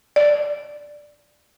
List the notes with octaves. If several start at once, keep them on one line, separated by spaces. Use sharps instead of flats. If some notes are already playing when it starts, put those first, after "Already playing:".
D5